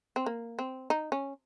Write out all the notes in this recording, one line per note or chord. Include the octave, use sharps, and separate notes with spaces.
C4
A#3
C4
D#4
C#4